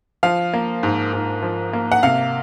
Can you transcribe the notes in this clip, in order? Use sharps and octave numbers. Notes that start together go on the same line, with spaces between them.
F3 F5
A#3
G#2
G#2
F3
A#3
F#5
C3 F5